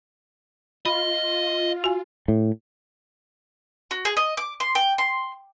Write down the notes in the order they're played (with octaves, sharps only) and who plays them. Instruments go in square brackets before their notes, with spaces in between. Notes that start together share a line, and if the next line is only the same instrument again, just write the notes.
[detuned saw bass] F4 [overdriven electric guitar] D#5 [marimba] B5
[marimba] F#4 G#5
[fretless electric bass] A2
[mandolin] F#4
G#4
D#5
D6
C6
G5
C6